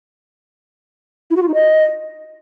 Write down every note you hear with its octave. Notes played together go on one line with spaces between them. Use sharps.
E4
F#4
F4
D#4
D#5